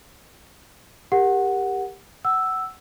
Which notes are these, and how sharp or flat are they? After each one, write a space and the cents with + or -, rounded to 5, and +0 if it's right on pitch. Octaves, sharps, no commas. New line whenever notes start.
G4 +15 A#4 +0 F#5 +0
F#5 +15 E6 +0